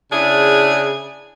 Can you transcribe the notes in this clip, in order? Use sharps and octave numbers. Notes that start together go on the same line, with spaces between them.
C#3 D4 E4 G#4